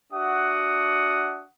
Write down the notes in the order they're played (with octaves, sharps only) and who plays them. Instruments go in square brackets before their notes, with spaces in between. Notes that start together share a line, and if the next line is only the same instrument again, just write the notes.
[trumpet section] D4 F#4 E5 F#5 D#6